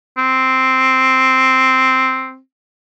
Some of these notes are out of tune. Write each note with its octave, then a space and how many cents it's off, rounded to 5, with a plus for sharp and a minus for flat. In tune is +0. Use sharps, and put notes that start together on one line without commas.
C4 +0